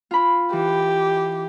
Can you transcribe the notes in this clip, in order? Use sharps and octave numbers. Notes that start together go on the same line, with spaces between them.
F4 B5
E3 G4